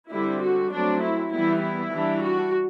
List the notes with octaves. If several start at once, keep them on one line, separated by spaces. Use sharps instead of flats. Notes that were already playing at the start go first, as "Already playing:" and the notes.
D3 G3 C4 E4
F#4
F#3 A3 C4 D4
E4
E3 G3 B3 E4
E4
E3 G3 D4
F#4